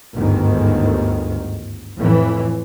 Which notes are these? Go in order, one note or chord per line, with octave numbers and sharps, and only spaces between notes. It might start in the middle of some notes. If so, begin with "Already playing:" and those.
G1 D2 G#2 D#3
F2 A2 E3